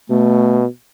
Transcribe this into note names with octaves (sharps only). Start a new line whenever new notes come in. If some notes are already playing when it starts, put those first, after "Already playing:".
B2 A3